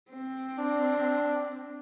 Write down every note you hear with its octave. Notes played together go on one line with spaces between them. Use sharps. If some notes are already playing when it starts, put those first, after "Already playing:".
C4
D4